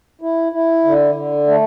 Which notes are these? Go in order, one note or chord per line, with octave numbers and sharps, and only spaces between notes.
E4
E4
D3
D3
A3